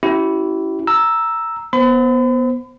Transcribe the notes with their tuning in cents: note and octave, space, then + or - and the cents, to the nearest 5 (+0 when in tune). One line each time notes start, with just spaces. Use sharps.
C#4 +5 E4 +0 G4 -40
A#5 +0 E6 +0
B3 -15 C5 +0 B5 +40